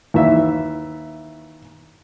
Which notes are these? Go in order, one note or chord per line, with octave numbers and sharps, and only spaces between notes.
D#2 E3 E5